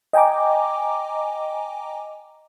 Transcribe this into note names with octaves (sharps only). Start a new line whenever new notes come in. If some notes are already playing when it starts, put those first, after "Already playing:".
D#5 G5 G#5 A#5 D6